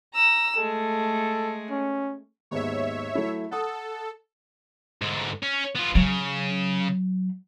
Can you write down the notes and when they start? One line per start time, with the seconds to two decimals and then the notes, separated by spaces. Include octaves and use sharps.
0.14 A#5 E6
0.57 G#3 A3 A4
1.70 C#4
2.51 D#2 G#2 B3 C#5 E5
3.15 F#3 A3 E4
3.51 A4 F#5 D#6
5.02 G#2 D3
5.43 C#4
5.76 B3 F4
5.95 C#3 F#3